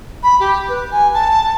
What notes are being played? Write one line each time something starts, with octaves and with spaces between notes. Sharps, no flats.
B5
G4
B4
G#5
A5